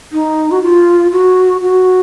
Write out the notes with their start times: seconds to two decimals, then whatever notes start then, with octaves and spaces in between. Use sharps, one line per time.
0.13 D#4
0.51 F#4
0.63 F4
1.12 F#4
1.62 F#4